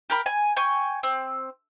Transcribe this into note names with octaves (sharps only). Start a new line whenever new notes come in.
G4 A#4 B5
G#5
G5 G#5 C#6
C4